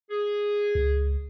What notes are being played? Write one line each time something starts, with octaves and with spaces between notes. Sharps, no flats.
G#4
C#2